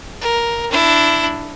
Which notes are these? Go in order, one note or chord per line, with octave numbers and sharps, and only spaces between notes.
A#4
D4 E4